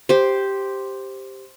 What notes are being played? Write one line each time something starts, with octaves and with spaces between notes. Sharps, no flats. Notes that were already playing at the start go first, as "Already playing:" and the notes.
G4 C5